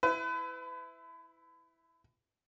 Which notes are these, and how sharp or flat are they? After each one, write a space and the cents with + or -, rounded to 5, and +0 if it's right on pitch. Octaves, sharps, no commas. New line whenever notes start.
E4 +0 B4 +35